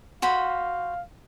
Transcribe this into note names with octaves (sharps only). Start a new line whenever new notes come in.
F#4 C5 F5 B5